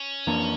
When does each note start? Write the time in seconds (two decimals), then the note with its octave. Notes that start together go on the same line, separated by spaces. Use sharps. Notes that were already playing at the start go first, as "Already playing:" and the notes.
Already playing: C#4
0.27 F2 E3 A#3 D4